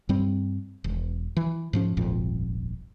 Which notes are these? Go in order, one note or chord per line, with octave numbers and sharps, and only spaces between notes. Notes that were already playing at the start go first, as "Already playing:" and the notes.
G2 G3 C4
E1
E3
G#2 F3 C#4
D#1 G#1 F2 A#2